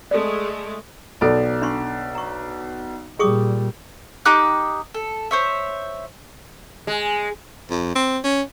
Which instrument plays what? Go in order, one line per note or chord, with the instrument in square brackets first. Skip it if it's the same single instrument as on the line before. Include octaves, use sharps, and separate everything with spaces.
[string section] G#3 A3 [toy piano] A4 D5
[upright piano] B1 D5 [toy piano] A4 A5 B5
[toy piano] D4 C6 C#6
A#5 C#6
[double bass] A#2 G3 [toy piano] G#4 C#6 D#6
[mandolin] D#4 G4 D6 F#6
A4
C5 C#5 E5
[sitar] G#3
[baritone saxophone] F2
C4
C#4